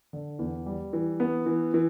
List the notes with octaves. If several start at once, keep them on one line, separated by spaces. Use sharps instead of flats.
D3
E2
G3
E3
B3
E3
E3